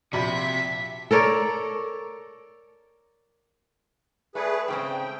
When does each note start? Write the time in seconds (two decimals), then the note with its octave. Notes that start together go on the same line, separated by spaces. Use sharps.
0.13 A#1 C3 F#4 E5 B5 B6
1.11 A4 A#4 C#5 D5
4.35 A3 G#4 B4 D5
4.68 G#2 C#3 C4 G5